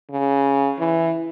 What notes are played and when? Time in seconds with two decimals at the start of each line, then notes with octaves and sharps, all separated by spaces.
0.10 C#3
0.79 E3